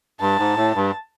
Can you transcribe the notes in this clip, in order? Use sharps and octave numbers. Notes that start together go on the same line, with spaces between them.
G2 A5
G#2
A2
G2